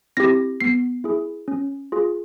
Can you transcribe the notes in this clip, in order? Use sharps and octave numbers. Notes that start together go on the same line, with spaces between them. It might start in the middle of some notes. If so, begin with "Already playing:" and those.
C4 E4 G4 A#6
B3 C7
E4 G#4
C#4
F4 G#4